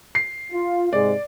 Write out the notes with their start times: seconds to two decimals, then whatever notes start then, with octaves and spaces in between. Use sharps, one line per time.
0.15 C7
0.52 F4
0.93 G#2 C3 G#3 D5